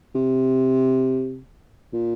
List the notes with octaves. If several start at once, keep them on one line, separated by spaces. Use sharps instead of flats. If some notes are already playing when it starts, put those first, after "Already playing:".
C3
A#2